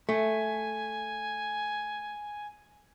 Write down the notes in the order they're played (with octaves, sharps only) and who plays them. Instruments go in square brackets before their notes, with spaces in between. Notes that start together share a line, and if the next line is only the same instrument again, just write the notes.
[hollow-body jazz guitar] A3 [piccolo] G#5